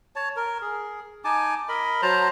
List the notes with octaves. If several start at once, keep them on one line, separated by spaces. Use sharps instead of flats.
C#5 A5
A#4
G#4
D#4 G#5 A5 D6
A#4 D#5 B5
F#3 C5 A5 A#5